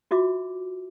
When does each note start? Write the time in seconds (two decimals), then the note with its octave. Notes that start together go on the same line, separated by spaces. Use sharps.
0.11 F4 F#4 E5 D6